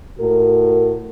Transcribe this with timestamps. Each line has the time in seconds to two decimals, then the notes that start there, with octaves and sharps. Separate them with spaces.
0.19 A2 F#4 A#4